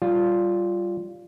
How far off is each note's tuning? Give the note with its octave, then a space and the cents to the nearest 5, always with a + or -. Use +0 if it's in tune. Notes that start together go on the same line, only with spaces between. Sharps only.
G3 -15 F4 +0